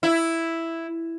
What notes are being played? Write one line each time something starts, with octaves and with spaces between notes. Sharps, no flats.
E4